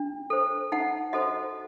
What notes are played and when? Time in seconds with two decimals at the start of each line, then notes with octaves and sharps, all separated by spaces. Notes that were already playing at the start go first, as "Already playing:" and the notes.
Already playing: D4
0.30 A4 C5
0.72 D#4 F#5
1.13 F#4 A4 C5 D#5